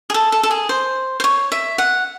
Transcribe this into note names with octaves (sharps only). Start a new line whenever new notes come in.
G#4
A4
A4
A4
G#4
C5
C5
C#5
E5
F#5